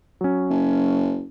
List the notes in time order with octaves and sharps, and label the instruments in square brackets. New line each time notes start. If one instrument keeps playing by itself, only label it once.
[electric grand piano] F#3 C#4
[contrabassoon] F#1